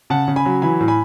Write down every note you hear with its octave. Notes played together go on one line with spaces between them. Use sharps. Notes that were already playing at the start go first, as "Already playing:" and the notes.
C#3 F#5 A5
C#3
G#5 B5
F#3
E3 G#5 B5
A2
G#5 B5